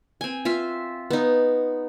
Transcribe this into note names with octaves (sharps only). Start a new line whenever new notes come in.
C4 G#5
F4 E5 F5
B3 D#4